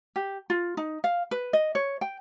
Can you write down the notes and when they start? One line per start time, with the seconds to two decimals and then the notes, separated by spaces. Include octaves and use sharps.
0.16 G4
0.50 F4
0.77 D#4
1.04 F5
1.31 B4
1.53 D#5
1.75 C#5
2.01 G5